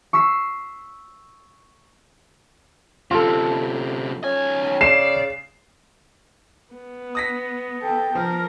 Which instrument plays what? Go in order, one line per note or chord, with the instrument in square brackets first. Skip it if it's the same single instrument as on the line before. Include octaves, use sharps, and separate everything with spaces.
[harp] C#6 E6 B6 C7
[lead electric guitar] F#2 C3 [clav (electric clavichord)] F4 A4
[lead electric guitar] B1 G#5 [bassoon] C#4
[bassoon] C#3 [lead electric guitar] D5 [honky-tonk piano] C7 E7
[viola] B3
[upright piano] D#6 A#6 B6
[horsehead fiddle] A4 G5
[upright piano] F3 [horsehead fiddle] A#4